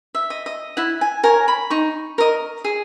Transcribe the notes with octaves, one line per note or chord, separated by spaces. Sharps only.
E5
D#5
D#5
E4 F#5
G#5
A#4 C#5 G#5
B5
D#4 C#6
A#4 D#5
G#4